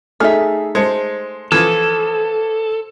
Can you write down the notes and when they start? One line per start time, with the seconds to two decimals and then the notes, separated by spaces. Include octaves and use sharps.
0.20 A3 D#4 G#4 E5 F6
0.75 G#3 C5 A5 C#7
1.52 E3 F3 A4